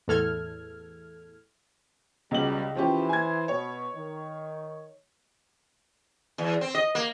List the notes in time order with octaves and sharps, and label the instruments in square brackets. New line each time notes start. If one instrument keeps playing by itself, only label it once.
[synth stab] E2 A2 A4 F6 G#6
[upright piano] C#2 F#7 [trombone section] B2 F#3 G3
[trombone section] E3 C5 [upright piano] F3 C#4 G4
[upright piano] G#5 G#6
[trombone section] B2 [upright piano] C#5
[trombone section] D#3
[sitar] E2
C4
D#5
A#3